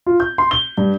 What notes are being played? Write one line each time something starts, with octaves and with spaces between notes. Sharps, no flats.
F4
G6
C6
G7
G2